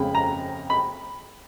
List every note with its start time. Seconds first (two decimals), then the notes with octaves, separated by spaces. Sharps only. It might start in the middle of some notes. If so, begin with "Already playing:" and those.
Already playing: F2 C#3 G#3 B5
0.15 A#5
0.70 B5